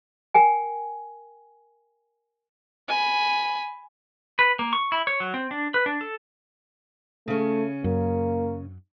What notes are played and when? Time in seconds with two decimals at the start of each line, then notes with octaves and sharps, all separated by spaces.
0.34 A#4 G5 G#5
2.88 G#5 B5
4.39 B4
4.59 A#3
4.73 C#6
4.92 E4
5.07 C#5
5.20 F#3
5.34 C4
5.51 D4
5.74 B4
5.86 D4
6.01 A4
7.28 C#3 A3 C#4
7.84 F#2 A#3